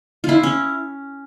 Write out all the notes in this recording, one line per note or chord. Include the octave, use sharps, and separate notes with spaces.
E4 F4
C#4